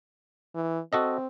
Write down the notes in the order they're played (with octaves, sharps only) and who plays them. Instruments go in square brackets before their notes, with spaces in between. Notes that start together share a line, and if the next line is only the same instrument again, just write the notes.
[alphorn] E3
[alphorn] C4 [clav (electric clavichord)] F#4 A4 D#5